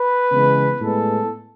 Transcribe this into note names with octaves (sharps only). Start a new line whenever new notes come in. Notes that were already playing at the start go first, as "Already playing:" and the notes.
Already playing: B4
C#3 E3 G#3 B3
A2 G#3 B3 A4